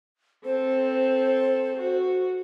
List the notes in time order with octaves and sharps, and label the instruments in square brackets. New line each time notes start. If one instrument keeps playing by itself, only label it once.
[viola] C4 A4 [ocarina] C5
[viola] F#4